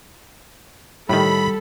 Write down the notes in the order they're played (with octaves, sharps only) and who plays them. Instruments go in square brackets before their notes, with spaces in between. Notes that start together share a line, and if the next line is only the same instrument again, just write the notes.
[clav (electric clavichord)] A2 D#3 [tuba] G3 [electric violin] A4 [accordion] B5